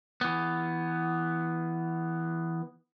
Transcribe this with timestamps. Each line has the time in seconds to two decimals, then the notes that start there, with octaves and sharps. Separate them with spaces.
0.21 E3 B3